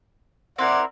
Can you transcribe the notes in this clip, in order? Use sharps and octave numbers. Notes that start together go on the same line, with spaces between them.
C4 E4 A#4 D5 F#5